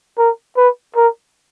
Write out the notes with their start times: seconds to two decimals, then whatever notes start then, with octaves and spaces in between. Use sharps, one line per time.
0.18 A#4
0.57 B4
0.96 A#4